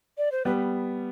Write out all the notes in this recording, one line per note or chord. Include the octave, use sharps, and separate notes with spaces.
D5
C5
G3 B3 B4